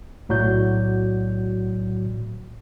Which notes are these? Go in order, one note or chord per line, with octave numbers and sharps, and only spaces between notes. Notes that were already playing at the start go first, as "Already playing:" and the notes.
B1 A2 F#3 F#4 D5 G6